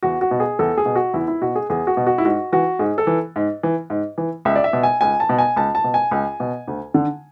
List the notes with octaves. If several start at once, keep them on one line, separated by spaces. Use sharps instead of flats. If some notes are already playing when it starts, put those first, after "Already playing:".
E2 F#4
F#4
B2
G#4
E2 A4
G#4
B2
F#4
E2 E4
E4
B2 F#4
G#4
E2 G#4
F#4
B2
F#4
E4
G#2 F#4
E3 F#4
G#2 G#4
A4
E3
G#2
E3
G#2
E3
C#2 E5
D5
E5
B2
G#5
C#2 G#5
A5
B2
G#5
C#2 A5
A5
B2
G#5
C#2
B2
D2
D3